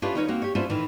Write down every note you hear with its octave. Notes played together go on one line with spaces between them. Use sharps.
C#4 D4 E4 F4 G4 B4
D#3 C#4 D#4 B4 C#5
A#3 C4 F#4
G4 C#5
B3 C#4 D4 E4 F4 C5
A2 D#3 E3